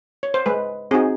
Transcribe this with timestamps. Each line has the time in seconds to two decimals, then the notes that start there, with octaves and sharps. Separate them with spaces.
0.23 C#5
0.34 C5
0.46 G#3 B4
0.91 C4 D#4 F#4 G#4